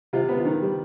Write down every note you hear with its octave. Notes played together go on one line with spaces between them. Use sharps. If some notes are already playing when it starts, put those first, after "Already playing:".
C3 F4
B3
F4
D#3
G3